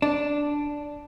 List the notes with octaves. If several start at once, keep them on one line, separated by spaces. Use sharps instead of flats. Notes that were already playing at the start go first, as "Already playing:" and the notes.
D4